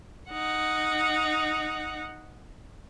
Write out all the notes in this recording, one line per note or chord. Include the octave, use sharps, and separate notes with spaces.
D#4 F#5